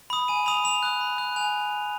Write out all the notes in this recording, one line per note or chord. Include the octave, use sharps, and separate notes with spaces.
B5 D#6
G#5 D#7
B5 D#6 F7
B5 F7
D#6 F#6
B5
D#6 F#6
G#5 F7